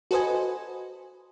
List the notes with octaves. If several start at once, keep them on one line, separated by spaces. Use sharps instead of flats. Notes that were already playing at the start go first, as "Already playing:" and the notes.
F#4 A4 B4 C5 D#5 G#5